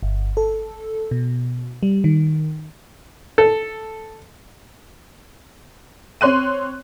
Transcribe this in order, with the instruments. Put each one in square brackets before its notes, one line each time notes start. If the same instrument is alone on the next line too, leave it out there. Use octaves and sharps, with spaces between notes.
[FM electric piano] G1
A4
B2
G3
D#3
[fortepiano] A4
[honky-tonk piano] C4 C#5 C6 F#6 D#7